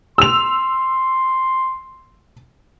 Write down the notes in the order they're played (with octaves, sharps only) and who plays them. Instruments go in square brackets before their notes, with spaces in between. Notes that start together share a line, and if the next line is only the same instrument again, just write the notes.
[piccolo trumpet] C6 [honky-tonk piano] E6 F7